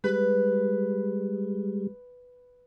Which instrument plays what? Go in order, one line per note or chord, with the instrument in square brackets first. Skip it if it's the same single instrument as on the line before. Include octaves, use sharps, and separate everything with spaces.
[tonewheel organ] G3 G#3 [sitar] B4